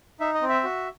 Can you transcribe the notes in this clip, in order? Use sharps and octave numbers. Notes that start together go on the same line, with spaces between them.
D#4 E5
D#5
C4
E5
F#4